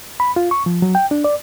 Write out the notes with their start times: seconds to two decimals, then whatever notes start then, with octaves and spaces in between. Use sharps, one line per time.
0.20 B5
0.36 F4
0.51 C#6
0.66 F3
0.82 F#3
0.95 G5
1.11 D4
1.24 D5